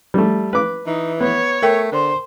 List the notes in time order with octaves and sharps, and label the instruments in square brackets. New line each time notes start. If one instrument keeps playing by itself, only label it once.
[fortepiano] G3 A3
B4 D6
[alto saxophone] E3 [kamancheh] D#4
[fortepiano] B3 [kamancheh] C#5
[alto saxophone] A3 [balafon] A#4 G5
[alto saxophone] D3 [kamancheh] C5